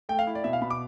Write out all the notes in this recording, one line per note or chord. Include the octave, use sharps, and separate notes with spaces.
A3 G5
F5
E4
D5
B2 E5
F5
B2 B5
D6